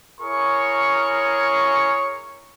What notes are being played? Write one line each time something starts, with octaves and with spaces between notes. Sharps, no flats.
E4 G#4 A#4 C#5 C#6